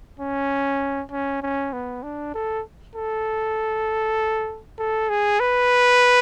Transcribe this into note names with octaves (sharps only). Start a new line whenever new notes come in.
C#4
C#4
C#4
B3
D4
A4
A4
A4
G#4
B4